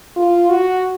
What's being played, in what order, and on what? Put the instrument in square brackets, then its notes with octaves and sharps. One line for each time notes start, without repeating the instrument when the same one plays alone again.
[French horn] F4
F#4